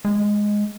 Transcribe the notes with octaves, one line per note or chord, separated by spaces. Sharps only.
G#3